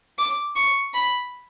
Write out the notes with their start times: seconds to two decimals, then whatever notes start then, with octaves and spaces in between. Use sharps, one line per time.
0.18 D6
0.56 C#6
0.94 B5